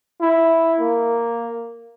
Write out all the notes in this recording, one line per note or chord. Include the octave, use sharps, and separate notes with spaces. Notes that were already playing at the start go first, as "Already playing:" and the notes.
E4
A#3